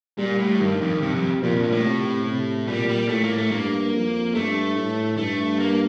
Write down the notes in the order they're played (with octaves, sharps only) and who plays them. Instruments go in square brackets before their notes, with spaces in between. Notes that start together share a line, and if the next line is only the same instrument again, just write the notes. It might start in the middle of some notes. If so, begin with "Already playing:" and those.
[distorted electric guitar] A#2 [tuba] G3
[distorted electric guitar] A2
[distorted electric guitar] G2 [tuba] D#3
[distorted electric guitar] F2
[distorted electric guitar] G2 [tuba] C3
[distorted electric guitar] F2
[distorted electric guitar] F2 [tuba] A#2
[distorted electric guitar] G2
A2
[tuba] C3
C3
[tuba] A#2 [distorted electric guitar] G3
[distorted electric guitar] G3
[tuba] A2 [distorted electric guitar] A3
[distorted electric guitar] A#3
A3
[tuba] G2 [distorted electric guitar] A#3
[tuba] F2
[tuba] G2 [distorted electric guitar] A3
[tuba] A2
[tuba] G2 [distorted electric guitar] A3
[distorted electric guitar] A#3